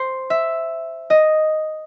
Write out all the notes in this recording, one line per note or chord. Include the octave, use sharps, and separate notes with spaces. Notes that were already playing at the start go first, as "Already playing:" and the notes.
Already playing: C5
E5
D#5